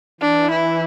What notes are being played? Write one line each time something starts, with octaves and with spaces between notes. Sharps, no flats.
E3 D4
E4